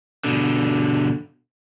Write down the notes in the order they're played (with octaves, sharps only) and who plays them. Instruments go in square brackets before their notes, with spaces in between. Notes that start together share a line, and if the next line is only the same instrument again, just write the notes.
[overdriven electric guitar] B2 D3